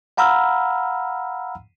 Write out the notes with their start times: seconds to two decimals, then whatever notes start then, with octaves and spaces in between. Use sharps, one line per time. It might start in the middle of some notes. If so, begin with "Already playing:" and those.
0.17 F5 F#5 A#5 B5 E6 F6